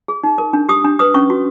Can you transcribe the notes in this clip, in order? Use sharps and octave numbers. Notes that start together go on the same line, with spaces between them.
G#4
D#4
A#4
D4
G4 D#6
D4
B4 D#6
C#4 C#6
F#4